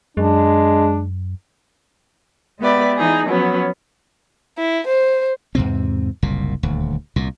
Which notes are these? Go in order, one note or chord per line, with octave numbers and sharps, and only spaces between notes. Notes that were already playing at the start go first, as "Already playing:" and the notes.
F#2 G#3 D4
G#3 B3 G4 B4 D5 E5
E3 D#4 G#4
F3 F#3 B3 C#4
E4
C5
E2 G#2 C3 C4
F#1 C2 A#2
D#1 D2
C2 A#2